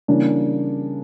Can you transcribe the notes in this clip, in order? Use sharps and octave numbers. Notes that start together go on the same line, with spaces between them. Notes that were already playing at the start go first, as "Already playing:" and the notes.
C#3 E3 G3 A#3 D4